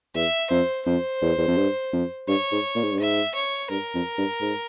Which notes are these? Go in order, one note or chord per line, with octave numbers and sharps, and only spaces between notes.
E2 E5
F2 C5
F2 C5
E2
E2
F2
G2
F2
G2 C#5
G#2
A#2
G#2
G2
G#2 E5
C#5
G2 A#4
F2
G2
G#2